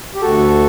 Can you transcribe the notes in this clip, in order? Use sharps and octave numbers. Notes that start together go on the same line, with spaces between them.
G4
D2 F#4 A4